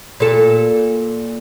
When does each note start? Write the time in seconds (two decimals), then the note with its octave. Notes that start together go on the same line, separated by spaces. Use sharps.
0.20 A#2 A4